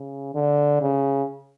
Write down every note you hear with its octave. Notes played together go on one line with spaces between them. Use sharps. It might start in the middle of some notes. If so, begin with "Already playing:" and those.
Already playing: C#3
D3
C#3